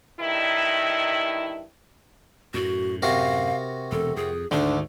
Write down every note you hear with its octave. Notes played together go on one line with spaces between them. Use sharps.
G2 D#3 D#4 E4
F#2 A2 F#4
C3 F#4 A#4 F5
E1 A4
F2 G#4
D2 G#2 D3 D#3 D4